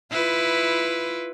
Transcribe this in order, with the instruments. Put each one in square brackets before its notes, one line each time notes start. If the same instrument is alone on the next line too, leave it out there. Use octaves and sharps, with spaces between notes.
[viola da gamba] E4 F4 B4